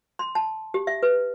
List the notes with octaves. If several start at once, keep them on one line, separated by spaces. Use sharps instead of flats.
C6
A5
G4
E5
B4